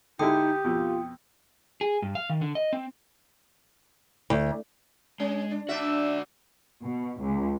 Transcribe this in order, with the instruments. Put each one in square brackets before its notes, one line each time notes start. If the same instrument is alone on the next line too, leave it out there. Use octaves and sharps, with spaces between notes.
[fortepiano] D3 G#3 E4 [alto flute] D#4 [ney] G4 [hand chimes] G5 D#6
[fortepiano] F2 B2 [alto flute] F4
[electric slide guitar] G#4
G2
F5
D#3
D3
D#5
C4
[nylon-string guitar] D2
[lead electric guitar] G#3 [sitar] C#4
[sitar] D4
[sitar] D4 E5 [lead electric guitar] F#4 D5
[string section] B2
C#2